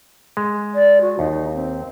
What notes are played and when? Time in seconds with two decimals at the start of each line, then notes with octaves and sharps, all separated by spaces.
0.37 G#3
0.74 D5
1.01 F#4
1.19 D#2 D#4
1.54 C4